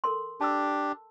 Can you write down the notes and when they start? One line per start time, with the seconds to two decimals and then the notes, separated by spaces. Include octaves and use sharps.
0.04 A4 A#4 C6
0.41 D4 G4 A5 E6